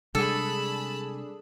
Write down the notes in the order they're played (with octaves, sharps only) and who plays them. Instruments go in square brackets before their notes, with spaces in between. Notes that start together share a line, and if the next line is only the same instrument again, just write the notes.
[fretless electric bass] C3 G3 G#3 [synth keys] D4 G#4 [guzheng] A4 [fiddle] A5 B5